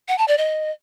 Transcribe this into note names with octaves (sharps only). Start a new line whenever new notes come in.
F#5
A5
D5
D#5